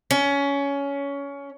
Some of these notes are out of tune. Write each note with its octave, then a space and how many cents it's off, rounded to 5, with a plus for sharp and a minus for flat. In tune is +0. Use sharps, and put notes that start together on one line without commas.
C#4 +20